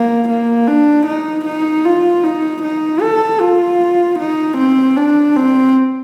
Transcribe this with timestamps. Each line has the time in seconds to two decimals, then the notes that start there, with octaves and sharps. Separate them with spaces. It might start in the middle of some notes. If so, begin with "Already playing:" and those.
Already playing: A#3
0.29 A#3
0.68 D4
1.07 D#4
1.46 D#4
1.85 F4
2.24 D#4
2.63 D#4
3.02 A4
3.41 F4
4.19 D#4
4.58 C4
4.97 D4
5.37 C4